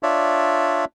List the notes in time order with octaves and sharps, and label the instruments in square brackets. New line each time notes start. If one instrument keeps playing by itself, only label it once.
[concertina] D4 F4 C#5 D5 E5